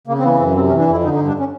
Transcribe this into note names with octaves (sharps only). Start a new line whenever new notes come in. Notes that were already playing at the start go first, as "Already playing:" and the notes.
C#3 A#3
C4
E3 B3
F#2 C4
C3 C4
C#4
E3
D4
F2 E4
D3 D#4
D#4
G2
D4
C#4